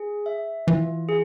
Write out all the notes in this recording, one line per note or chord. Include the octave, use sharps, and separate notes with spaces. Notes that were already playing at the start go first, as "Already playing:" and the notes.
Already playing: G#4
E5
E3 F4
G#4